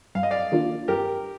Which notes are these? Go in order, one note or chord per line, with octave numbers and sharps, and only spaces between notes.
G2 F5
D#5
D5 F5
D#3 A#3 D4 F4
G2 G4 A#4